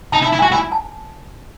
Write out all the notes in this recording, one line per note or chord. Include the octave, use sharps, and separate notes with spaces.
D#4 A5
E4
A5
E4
F#4 G#5
E4 G#5
A5